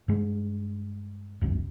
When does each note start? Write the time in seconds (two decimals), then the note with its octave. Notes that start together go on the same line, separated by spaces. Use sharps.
0.08 G2 G#3
1.41 E1 C#2 F#2